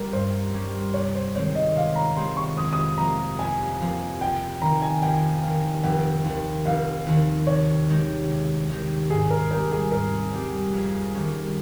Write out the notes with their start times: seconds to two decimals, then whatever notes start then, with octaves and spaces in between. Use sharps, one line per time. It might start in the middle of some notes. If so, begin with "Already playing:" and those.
Already playing: G3 C#4 A#4
0.13 G2 C5
0.53 G3 C#4
0.94 C3 C#5
1.15 C5
1.35 D#3 G#3 C4 C#5
1.55 D#5
1.76 C3 F5
1.96 A#5
2.17 D#3 G#3 C4 C6
2.37 C#6
2.57 F2 D#6
2.73 D#6
2.98 C3 F3 A#3 F4 A#5
3.39 F2 G#5
3.80 C3 F3 A#3 F4
4.20 F2 G5
4.61 D#3 A#3 A#5
4.82 G#5
5.02 F2 G5
5.43 D#3 A#3
5.83 F1 G5
6.24 D#2 D#3
6.65 F1 F5
7.07 D#2 D#3
7.47 C3 C#5
7.88 D#3 G#3 D#4 G4
8.29 C3
8.70 D#3 G#3 D#4 G4
9.10 G#2 G#4
9.30 A#4
9.51 G3 C4 G4 A#4
9.72 G#4
9.92 G#2 A#4
10.33 G3 C4 G4
10.73 F2
11.14 D#3 G3 C#4